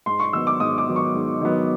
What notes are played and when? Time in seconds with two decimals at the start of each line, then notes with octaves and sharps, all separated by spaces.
0.06 G#2 C6
0.20 C#6
0.33 D#3 F#3 B3 E6
0.47 D6
0.60 G#2 D#6
0.78 D6
0.88 D#3 F#3 B3
0.96 C#6
1.14 G#2
1.41 D#3 F#3 B3